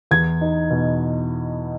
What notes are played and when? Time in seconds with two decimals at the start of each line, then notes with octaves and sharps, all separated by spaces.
0.11 E2 G#6
0.41 D#4
0.70 B2